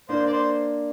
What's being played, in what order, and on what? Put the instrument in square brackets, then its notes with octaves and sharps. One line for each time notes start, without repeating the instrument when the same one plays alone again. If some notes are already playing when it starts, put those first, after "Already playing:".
[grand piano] A#3 D4 [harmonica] C5
[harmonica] D5
C5